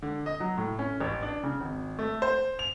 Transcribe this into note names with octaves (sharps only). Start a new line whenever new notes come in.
D3
D#5
F#3
A2
C#4
A1
D4
C#3
G#1
A3
C5
F7